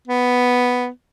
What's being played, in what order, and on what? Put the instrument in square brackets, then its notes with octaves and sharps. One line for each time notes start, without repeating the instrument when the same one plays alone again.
[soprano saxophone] B3